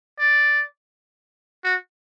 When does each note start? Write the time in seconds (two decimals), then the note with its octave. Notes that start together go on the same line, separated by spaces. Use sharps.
0.19 D5
1.64 F#4